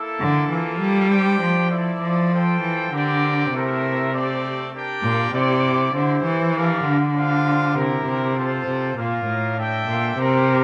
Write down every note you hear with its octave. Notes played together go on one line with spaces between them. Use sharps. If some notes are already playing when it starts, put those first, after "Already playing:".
Already playing: A#3 E4 A4
D3
E3 A#3 F4 A4
G3
D4 G4 C5 G5
F3
E4 A4 D5
F3
F4 A4 C5 G5
E3
D3 C4 G4 A#4 D5 G5
C3 A3 E4 A#4 E5
A3 C4 G4 D5
D4 G4 A#4 D5 G5
A#2
C3 E4 G4 D5
D3 E4 G4 C5
E3
D4 G4 A#4 D5 F5
D3
G3 D4 F4 C5 F5
C3 E4 G4 A#4
C3
F4 A4 C5
C3
A#2 A#3 F4 A#4 F5
A2
D4 A4 E5 G5
A#2
C3 C4 G4 A#4